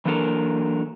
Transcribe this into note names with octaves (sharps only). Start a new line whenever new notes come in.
E3 F#3 A#3 D4 A4 A#4